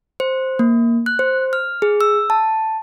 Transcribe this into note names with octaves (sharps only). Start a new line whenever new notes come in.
C5
A#3
F#6
C5
F6
G#4
E6
A5